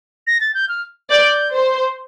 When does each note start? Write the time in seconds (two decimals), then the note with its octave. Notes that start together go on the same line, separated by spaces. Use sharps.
0.27 A#6
0.41 A6
0.54 G6
0.69 F6
1.11 D5 G6
1.53 C5